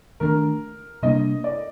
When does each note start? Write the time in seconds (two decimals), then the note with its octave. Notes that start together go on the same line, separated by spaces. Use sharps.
0.20 D#3 A3 D4 A#4
1.03 C3 G3 A#3 D4 D#5
1.44 D5